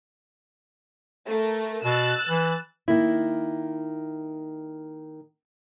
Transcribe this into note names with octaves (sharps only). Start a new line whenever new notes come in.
A3 A#4
B2 E6 F#6 A6
E3
D#3 A#3 E4